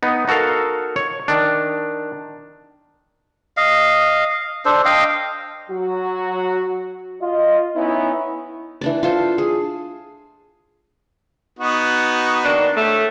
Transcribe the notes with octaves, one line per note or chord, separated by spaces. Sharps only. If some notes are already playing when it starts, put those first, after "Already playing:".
B3 D#4
D#4 F#4 A4 A#4 F5
C#5
D#3 D4
D#5 F5
D4 A4 C5
D#5 F5 G5
F#3 F#4
F4 D#5
B3 C#4 D#4 E4
E3 D4 D5
F4 A4 C5
G#4
B3 D#4 F#4
D#3 A#3 D4
A2 A3